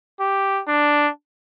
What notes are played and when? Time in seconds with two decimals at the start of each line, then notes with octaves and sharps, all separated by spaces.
0.20 G4
0.68 D4